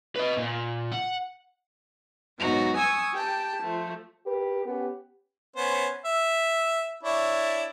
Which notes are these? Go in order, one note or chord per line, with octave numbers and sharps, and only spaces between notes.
B4 D#5
A#2
F#5
G#2 B2 F#3 D#4 F#4
G#5 C#6 D#6 E6 G#6
G4 G5 A5
F3 A3
G4 A#4 B4
B3 C#4 G4
B3 C#4 C5
E5
D4 E4 C#5